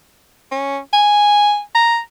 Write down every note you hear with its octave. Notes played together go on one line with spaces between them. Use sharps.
C#4
G#5
A#5